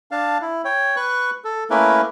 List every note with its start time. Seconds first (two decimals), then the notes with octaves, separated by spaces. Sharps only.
0.11 D4 F5 A5
0.41 E4
0.65 C#5 G5
0.96 B4 C#6 F#6
1.44 A4
1.70 A3 A#3 C#4 E4 A#4 B4